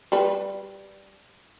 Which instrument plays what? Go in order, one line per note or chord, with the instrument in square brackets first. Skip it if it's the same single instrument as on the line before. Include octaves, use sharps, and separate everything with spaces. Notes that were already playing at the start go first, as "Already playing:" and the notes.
[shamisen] G3 B4